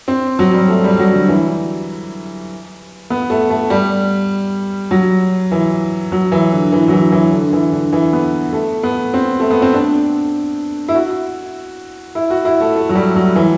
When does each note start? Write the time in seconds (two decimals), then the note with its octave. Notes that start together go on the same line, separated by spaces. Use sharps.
0.08 C4
0.39 F#3
0.53 G3
0.68 A3
0.84 G3
0.99 F#3
1.14 D3
1.29 E3
3.10 B3
3.30 A3
3.50 A3
3.70 G3
4.91 F#3
5.51 E3
6.12 F#3
6.32 E3
6.52 D3
6.72 E3
6.88 F#3
6.92 E3
7.12 E3
7.32 D3
7.53 E3
7.72 D3
7.93 E3
8.13 B3
8.53 A3
8.83 B3
9.14 C4
9.40 A3
9.51 B3
9.62 C4
9.74 D4
10.88 E4
10.95 F#4
12.15 E4
12.30 F#4
12.45 E4
12.60 A3
12.76 A3
12.89 F#3
12.95 G3
13.16 F#3
13.36 E3